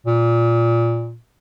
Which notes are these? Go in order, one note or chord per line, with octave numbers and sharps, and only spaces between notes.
A#2